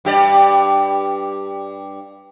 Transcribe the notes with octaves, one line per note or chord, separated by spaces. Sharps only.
G2 G4 D5